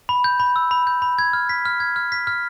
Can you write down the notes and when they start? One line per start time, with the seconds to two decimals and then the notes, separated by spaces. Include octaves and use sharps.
0.09 B5
0.24 G6
0.40 B5
0.56 E6
0.71 B5
0.87 G6
1.02 B5
1.19 G#6
1.33 F6
1.49 B6
1.65 F6
1.80 G#6
1.96 F6
2.12 B6
2.27 F6